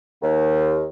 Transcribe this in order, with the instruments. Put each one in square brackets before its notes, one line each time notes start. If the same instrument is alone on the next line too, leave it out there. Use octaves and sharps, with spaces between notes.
[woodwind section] D#2